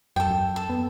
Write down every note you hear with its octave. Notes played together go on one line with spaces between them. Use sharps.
F#2 A4 G5
F#2
A4
B3